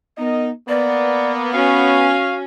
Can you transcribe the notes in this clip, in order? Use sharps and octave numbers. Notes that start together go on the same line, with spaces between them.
B3 D#4 A#4 D#5
A#3 B3 D5
C#4 F#4 F5